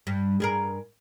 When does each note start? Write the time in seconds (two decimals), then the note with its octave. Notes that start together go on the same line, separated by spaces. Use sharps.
0.07 G2
0.40 G2 G#4 A#4